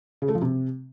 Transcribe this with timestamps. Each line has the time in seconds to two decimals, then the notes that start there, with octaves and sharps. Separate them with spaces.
0.22 C#3
0.28 A3
0.35 F3
0.42 C3